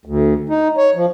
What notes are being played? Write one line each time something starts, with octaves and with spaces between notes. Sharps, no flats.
D2
D#4
C#5
F3